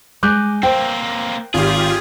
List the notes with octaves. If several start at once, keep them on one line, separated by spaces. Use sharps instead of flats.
G#3 D6 F#6 G6
A#3 C4 C5 G5
G#1 F4 G4 G#4